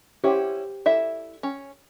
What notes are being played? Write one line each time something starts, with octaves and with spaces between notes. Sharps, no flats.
C#4 E4 G4 C5 F#5
E4 A4 D5 E5
C#4